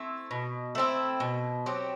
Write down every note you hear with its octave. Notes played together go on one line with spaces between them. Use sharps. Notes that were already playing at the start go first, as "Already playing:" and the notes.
Already playing: A3 C4 E4
B2
A3 C4 E4
B2
F#3 C4 G4